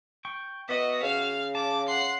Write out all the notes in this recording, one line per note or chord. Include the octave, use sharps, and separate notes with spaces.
G5 C#6
B3 F#4 D#5 E5
C#3 F5 F6
A5 D6
F#5 C6 C7